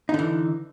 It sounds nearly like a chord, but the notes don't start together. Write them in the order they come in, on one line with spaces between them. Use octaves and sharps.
D#4 D3 E3